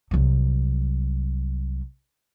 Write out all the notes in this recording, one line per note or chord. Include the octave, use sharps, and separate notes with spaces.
C2 F#3